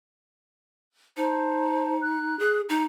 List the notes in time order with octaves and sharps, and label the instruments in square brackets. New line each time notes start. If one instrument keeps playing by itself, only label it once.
[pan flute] D#4 [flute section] C5 A5
[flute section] F#6
[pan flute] G#4
D#4